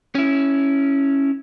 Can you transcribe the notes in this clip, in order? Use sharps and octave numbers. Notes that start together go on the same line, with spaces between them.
C#4 E4